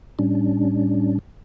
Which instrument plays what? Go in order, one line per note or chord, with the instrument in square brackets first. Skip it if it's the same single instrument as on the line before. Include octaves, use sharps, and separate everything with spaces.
[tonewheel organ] A2 G3 C#4 D4